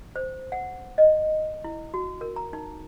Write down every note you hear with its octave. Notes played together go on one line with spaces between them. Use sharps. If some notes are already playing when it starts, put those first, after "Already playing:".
C5
F#5
D#5
E4
F#4
A#4
A#5
D#4